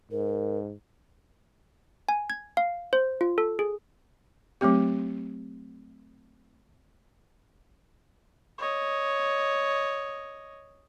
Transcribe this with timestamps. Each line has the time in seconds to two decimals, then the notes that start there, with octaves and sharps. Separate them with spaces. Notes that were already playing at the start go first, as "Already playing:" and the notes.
0.11 G#2 A#4
2.09 G#5
2.30 G#6
2.57 F5
2.93 C5
3.21 F4
3.38 A4
3.59 G#4
4.61 F#3 A3 C4 G4
8.58 C#5 D#5